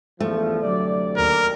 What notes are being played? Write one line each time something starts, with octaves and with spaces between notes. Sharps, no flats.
E2 G2 F3 A3
D2 C3 F#3 D5
D#2 A#4